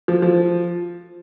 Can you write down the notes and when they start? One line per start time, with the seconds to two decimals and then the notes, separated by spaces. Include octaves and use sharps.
0.08 F3
0.22 F3